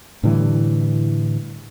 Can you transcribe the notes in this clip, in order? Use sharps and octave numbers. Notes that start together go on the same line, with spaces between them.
A2 D3 E3 G3